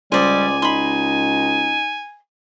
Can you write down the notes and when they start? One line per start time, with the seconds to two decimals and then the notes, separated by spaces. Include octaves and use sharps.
0.12 C#2 G3 C5 D5 D#5 G#5
0.62 D#4 B5 C6